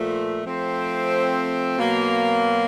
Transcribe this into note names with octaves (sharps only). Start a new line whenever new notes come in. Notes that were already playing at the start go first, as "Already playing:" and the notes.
Already playing: A#2 F3 A3
F3 A3 C4
B2 F#3 A#3